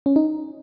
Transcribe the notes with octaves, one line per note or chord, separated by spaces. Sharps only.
C#4
D#4